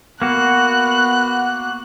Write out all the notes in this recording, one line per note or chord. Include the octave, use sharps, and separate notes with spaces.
A#3 B3 F#4 F#6